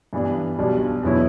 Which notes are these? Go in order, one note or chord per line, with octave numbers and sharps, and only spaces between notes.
G2 E3 G3 B3 D4
B1 B2 G3 D4
E2 B2 F#3 B3 E4